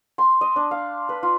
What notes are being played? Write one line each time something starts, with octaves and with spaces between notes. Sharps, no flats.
C6
D#5
D4
F5
B4
F4